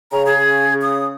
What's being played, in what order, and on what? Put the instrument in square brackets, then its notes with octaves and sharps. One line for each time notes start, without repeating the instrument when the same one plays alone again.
[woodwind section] C#3 [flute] A#5
[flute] G#4
D#6